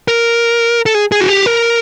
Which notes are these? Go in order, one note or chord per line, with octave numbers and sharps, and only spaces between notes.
A#4
A4
G#4
G#4
F#4
G4
A#4